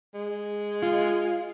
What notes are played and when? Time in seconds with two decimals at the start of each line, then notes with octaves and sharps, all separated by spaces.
0.14 G#3
0.82 F4